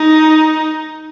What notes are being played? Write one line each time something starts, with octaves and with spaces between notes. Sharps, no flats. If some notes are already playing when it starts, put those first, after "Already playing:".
Already playing: D#4